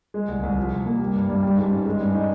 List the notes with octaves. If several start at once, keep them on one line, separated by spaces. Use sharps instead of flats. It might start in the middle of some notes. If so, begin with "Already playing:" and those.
G#3
C2
C2
F3
C2
A#3
G3
G2
G2
G3
G#2
C#4
G#3
G2
D#4